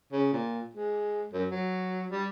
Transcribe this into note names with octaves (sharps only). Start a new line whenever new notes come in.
C#3
A#2
G#3
F#2
F#3
G3